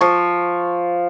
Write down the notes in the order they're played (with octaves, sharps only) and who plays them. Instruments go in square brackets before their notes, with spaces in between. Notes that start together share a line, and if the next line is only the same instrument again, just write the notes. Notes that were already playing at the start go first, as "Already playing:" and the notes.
[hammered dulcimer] F3 C#6